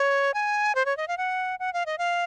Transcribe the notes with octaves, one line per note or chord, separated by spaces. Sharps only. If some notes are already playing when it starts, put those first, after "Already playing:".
Already playing: C#5
G#5
C5
C#5
D#5
F5
F#5
F#5
F5
D#5
F5